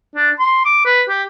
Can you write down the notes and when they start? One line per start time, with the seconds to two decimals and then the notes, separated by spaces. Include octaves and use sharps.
0.15 D4
0.39 C6
0.65 D6
0.85 B4
1.09 G4